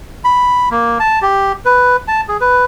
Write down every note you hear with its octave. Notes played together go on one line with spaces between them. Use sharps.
B5
A#3
A5
G4
B4
A5
G#4
B4